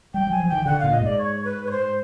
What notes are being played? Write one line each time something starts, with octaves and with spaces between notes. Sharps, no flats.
G3 G5
F#3 G#5
F3
D#3 G5
D3 F#5
A#2 F5
D#5
G#2 D5
C#5
B4
C#5
C5